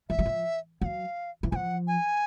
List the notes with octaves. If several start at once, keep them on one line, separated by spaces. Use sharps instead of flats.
F3 E5
F#3
F3
F#3 F5 F#5
E3
F3 F#5 G#5
G#5